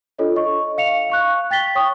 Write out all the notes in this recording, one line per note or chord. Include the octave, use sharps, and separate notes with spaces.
D4 F4 A4 C#5 D#5
D#5 C#6
F5 C#7 F7
F5 C#6 F#6
G5 A6 B6 G7
C#5 G5 C#6 D#6